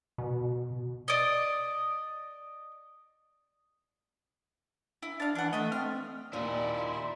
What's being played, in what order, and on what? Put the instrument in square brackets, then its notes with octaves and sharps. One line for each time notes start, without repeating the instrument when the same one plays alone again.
[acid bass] B2
[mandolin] D5 D#5
E4
[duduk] D4 [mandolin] F5 A5
[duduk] E3 [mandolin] D4 F#5
[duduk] A3 [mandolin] D#5 E5
[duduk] C4 [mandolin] F6
[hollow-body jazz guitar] D#2 A#2 [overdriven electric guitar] D#4 E4 [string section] D5 [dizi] C6